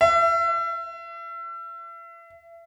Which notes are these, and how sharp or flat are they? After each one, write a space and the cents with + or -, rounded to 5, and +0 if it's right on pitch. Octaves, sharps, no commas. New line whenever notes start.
E5 +35